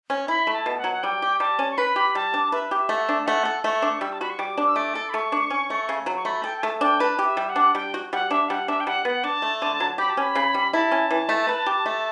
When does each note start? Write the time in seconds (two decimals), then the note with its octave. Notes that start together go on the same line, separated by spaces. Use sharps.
0.10 C#4
0.28 E4 B5
0.47 A3
0.53 A5
0.66 B2
0.78 F#5
0.84 F#3
0.92 F#5
1.03 G3 G5
1.22 G4
1.40 G3 A5
1.59 C#4
1.71 C#6
1.78 B4 B5
1.96 G4
2.15 G3 A5
2.34 D4
2.52 B4 E5
2.71 G4
2.77 E5
2.89 A3
2.97 F#5
3.02 E5
3.09 D4
3.26 A3 F#5
3.45 A4
3.64 A3 C#6
3.82 D4
4.01 G3 E6
4.13 A5
4.21 F#4 B5
4.30 C#6
4.39 G3 D6
4.57 D4
4.66 E6
4.76 A3 D6
4.95 A4
5.10 B5
5.13 A3 C#6
5.32 D4
5.50 C#4
5.70 A3
5.89 C#3
6.06 F#3
6.16 C#6
6.25 A3 B5
6.44 A4 G5
6.58 G5
6.63 A3 A5
6.81 D4 G5
7.00 B4 A5
7.19 G4
7.25 E5
7.37 G3
7.49 F#5
7.56 D4
7.75 G3 G5
7.94 F#4
8.13 G3 F#5
8.31 D4 E5
8.49 G3 F#5
8.68 D4 E5
8.80 G5
8.87 G3 F#5
9.05 B3 F#5
9.24 D4 A5
9.42 A3
9.62 D3
9.80 F#3
9.98 G4 B5
10.09 A5
10.17 C#4 B5
10.35 C#3
10.54 G3
10.73 E4 A5
10.91 C#4
11.11 E3
11.29 A3
11.49 B4
11.66 G4
11.86 A3